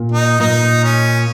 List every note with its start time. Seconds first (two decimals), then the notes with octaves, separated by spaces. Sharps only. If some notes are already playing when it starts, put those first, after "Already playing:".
Already playing: A#2
0.12 D#4
0.40 A#2 D#4
0.83 C#4